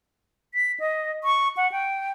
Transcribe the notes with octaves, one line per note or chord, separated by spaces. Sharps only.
B6
D#5
C#6
F#5
G5